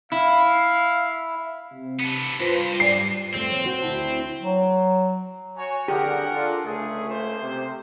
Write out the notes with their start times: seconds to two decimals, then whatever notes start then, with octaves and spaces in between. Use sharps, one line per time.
0.12 E4 F5
1.71 C3
2.00 B3 A4
2.40 G2 F4 B4 C5
2.80 G#2 G3 D5 C7
3.34 F2 A3 C4 C5
3.50 A#2 C#5
3.65 F#4 C5
3.82 D2 E4 A5
4.39 F#3
5.57 F#4 C#5 G#5
5.88 D3 G4 G#4 A#4 F#5
6.32 D4 F4 A4
6.65 C#2 A3 G#4
7.09 A#3 C5
7.40 C3